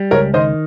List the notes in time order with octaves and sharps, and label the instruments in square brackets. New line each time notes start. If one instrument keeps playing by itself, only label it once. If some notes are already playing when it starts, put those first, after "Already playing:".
Already playing: [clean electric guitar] G3
[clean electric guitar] C#2 [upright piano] A#4 C#5
[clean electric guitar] D#3 [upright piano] C5 D#5